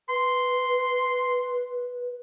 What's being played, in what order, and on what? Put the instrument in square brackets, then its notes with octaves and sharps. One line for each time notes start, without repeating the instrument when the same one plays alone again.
[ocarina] B4 [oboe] C6